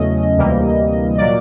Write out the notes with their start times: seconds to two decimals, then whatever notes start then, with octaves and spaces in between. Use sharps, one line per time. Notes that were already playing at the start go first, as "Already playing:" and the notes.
Already playing: E2 C#3 F#3 A3 C#4 D#5
0.37 D2 C3 E3 G3 A#3
1.18 A#2 F#3 A#3 D5